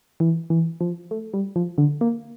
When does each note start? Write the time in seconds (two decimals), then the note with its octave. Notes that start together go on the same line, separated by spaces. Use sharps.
0.20 E3
0.50 E3
0.81 F3
1.11 A3
1.34 G3
1.56 F3
1.78 D3
2.01 A#3